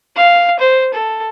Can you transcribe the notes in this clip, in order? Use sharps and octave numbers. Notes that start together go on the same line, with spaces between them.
F5
C5
A4